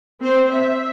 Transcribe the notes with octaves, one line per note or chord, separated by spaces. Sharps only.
C4 C5
E5